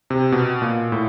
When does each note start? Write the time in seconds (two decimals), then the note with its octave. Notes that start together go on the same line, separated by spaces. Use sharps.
0.10 C3
0.32 B2
0.62 A#2
0.92 A2